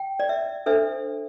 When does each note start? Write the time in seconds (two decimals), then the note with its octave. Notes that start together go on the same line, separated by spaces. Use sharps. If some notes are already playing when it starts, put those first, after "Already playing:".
Already playing: G5
0.20 D5
0.29 E5
0.66 D4 A4 C5 E5